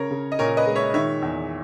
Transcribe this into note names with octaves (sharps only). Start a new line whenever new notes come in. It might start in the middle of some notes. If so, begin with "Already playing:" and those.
Already playing: C#3 A#4 C#5
C#3
D#5
A#2 A#4 C#5
B4 D#5
G#3
C#5 E5
D#3 C#5 E5
E2